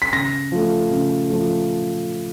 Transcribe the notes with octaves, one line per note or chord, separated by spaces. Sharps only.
B6
C#3 A#6
F3 A3
C#3
F3 A3